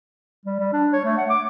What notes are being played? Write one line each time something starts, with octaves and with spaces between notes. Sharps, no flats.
G3
G3
D4
C#5
A3
F#5
D6